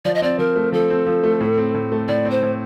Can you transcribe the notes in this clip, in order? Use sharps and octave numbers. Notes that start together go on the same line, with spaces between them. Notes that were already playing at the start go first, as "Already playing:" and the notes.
F3 D5
D#5
C4 D5
F3 A#4
A3
F3 A4
C4
F3
A3
A2
C4
A2
A3
A2 D5
C4
C5
A2